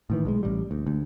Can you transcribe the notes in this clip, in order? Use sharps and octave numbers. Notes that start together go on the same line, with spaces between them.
A2 D#3 E3
B1 G3 G#3
A1 G3
D2
D2